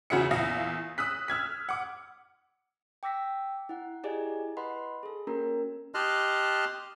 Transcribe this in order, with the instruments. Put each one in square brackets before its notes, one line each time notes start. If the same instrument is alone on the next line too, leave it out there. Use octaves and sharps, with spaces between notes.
[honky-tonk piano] E2 C#3 F#4 G#4 E5 C#7
E2 A#2 E5 F5 D#6 A#6
D#6 E6 F#6 B6
E6 F6 G#6 B6
F#5 D6
[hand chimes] G5 D6 E6 A#6 B6
E4 F#5
E4 G4 G#4 D5 D#5 G#5
B4 D#5 F#5 B5 C6
G#4 A4
A#3 C#4 F#4 A#4 A#5
[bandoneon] G4 D#5 A5 C6 F6 F#6